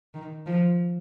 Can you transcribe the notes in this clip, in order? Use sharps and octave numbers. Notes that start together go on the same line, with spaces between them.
D#3
F3